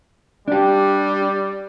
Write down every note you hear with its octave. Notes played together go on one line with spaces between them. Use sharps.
G3 D4 G4